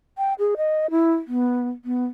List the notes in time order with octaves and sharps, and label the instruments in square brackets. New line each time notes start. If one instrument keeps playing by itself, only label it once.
[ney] G5
G#4
D#5
E4
B3
B3